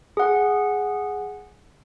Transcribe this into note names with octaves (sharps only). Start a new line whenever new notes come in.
G#4 F#5